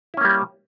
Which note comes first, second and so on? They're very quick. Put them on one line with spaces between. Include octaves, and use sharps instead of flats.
E4 C#4 A#3 G3